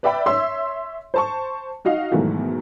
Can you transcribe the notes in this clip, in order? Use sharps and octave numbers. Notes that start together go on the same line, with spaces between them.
B4 D5 E5 G5 B5
C#5 E5 C6 E6
C5 A5 C#6
D#4 F#4 D#5 F5
G#2 B2 D#3 E3 F#3 A3